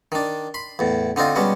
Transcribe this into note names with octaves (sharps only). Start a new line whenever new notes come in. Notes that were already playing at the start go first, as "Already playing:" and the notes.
D#3 D4
B5 C6
E2 A2
D3 C4 D#4 F4
B2 G3 G#3 C#4